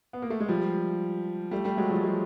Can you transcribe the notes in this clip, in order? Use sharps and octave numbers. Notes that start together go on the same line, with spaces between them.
B3
A#3
A3
G#3
F3 G3
G3 A3
G3 A3
F#3 G#3
F3 G3
F#3 G#3